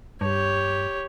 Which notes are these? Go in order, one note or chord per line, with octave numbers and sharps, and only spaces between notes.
G2 G4 C#5